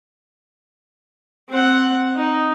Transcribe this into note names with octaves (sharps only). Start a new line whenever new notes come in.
C4 F#5
D#4